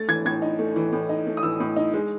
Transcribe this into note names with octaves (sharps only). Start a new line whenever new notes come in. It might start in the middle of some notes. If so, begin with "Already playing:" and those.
Already playing: A3 A6
E3 G#6
A2 G#6
D#4
A3
E3
A2
D#4
A3
D#6
E3 E6
A2
D#4
G#3